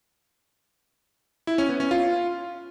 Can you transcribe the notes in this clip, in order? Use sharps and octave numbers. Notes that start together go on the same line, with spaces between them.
E4
C#4
B3
C#4
F4